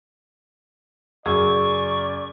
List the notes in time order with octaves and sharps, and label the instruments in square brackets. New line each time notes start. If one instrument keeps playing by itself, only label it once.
[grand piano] F#2 C#3 F#3 [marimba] G#4 [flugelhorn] D5 [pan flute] C#6